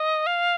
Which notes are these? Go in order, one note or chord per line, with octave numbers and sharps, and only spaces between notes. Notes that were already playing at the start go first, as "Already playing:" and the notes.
Already playing: D#5
F5